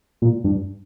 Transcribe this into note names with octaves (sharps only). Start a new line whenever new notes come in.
A#2
G2